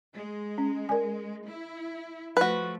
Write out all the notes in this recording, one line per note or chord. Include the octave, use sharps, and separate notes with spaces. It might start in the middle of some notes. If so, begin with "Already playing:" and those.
G#3
C#4
A#4 D5 G#5
E4
F3 A3 F#4 B4